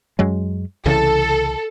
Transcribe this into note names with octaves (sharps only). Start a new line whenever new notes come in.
F#2 F#3 G#3
C2 C#3 E3 A4